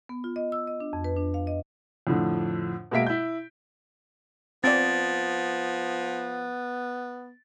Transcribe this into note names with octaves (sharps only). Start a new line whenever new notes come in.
B3
F4
D#5
E6
D#5
D4
F2
B4
D4
F5
D#5
F2 A2 D3
B2 G#3 A#3 E5 B6 D7
E4 G6
F3 B3 C4 D5 A6 D7